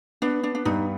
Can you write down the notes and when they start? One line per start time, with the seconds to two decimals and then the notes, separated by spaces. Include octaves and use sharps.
0.22 B3 D4
0.43 D4
0.55 D4
0.65 G2 D#4